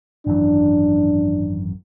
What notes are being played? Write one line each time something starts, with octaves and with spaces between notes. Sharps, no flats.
G#1 F#2 E3 D4